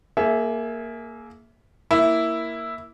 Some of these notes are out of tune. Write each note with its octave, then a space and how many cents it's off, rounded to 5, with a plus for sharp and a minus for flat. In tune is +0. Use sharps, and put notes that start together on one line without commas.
A#3 -5 G#4 +25 E5 -5
A#3 +0 E4 +0